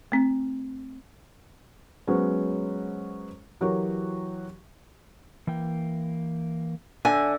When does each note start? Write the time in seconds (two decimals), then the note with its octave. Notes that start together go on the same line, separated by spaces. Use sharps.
0.12 A3 C4
2.07 F#3 G#3 B3 C#4 C5
3.61 E3 F#3 F#4 G4 A#4 C#5
5.47 E3 A#3 G5
7.05 D3 E5 G#5